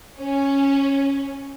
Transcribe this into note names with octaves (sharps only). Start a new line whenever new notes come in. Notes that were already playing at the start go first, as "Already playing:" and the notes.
C#4